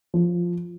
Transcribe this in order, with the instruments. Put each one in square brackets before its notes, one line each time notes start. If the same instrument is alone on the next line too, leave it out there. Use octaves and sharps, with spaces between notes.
[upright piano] F3